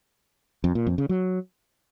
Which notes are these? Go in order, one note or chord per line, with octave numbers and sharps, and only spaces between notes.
F2
A#2
F2
C#3
F#3